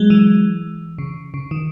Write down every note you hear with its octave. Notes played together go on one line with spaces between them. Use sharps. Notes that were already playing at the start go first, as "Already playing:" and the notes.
Already playing: F#3 G#3
E3
C#3
C#3
D#3